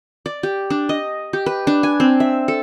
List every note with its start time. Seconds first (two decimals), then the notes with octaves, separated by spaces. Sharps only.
0.26 D5
0.43 G4
0.70 D4
0.89 D#5
1.33 G4
1.46 B4
1.67 D4
1.83 G#5
2.00 C4
2.20 E5
2.48 A4